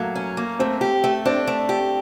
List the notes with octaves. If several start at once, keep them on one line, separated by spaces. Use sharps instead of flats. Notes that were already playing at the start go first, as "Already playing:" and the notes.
Already playing: F#3 A3 A#3
C#4
A#3
A3 C4
G4
A3
C4 D4
A3
G4